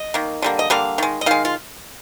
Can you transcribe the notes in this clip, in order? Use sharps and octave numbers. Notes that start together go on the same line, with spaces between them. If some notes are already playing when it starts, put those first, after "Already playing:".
Already playing: D#5
D#3 A#3
D3 G3 A#3
D#5
D3 G3 A#3 F5
D#3 G#3
D#5
D#3 G#3 F5
F4